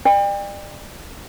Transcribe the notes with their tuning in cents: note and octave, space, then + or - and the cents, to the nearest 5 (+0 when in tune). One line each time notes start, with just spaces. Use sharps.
D5 +35 G5 +35